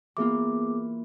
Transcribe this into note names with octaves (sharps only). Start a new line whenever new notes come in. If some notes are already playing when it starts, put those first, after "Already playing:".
E3 A#3 B3 F4 G#4 D6